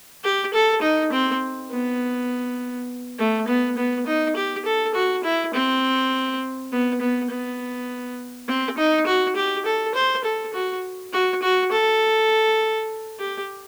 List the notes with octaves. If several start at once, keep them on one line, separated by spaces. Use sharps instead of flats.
G4
A4
D#4
C4
B3
A3
B3
B3
D#4
G4
A4
F#4
E4
C4
B3
B3
B3
C4
D#4
F#4
G4
A4
C5
A4
F#4
F#4
F#4
A4
G4